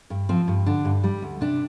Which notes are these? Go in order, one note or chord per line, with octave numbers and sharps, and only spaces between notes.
G2
F3 C4
G2
D3 D4
G2
G3
D2
C3 D4